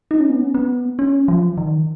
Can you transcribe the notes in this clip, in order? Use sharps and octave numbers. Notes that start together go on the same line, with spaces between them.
D#4
C#4
B3
C#4
B3
C#4
F3
D#3